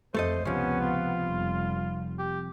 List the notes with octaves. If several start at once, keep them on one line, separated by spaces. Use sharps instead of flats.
F2 A3 A4 C5 D#5
C#2 C3 F3 B3 C#4
F4
F1 G3
G4